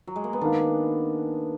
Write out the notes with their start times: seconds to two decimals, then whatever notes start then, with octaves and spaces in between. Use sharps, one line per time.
0.07 F#3
0.16 G#3
0.24 A#3
0.33 B3
0.41 D#3 A#3 D4 D#4 A#4 F5